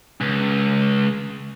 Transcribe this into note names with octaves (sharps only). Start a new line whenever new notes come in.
C#2